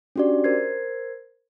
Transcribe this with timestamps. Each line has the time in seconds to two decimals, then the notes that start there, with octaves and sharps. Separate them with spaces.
0.16 C#4 D4 F#4 G4 D5
0.44 A#4 C5 G#6 C7